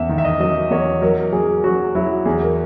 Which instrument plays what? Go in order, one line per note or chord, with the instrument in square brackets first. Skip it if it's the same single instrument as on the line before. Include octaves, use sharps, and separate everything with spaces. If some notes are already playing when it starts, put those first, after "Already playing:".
Already playing: [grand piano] E2 E5
D#3
E5
D#5
F#3 D#5
E2 C#5
F#3 A#4
F#3 G#4
F#3 F#4
F#3 E4
E2 G#4
A#4